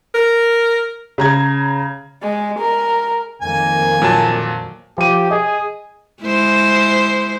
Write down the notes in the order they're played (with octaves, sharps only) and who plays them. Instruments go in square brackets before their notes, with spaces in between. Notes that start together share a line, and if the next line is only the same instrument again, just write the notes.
[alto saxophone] A#4
[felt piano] C#3 A#5 G#6
[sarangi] G#3
A#4
[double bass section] F2 D#3 A#3 [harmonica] G#5
[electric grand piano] A#2 F#3 A5
[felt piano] F3 D#7 [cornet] G4
[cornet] G#4 [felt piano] D#5
[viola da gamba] G#3 E4 C5